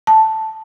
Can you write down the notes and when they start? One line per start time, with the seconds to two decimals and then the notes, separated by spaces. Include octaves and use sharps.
0.07 A5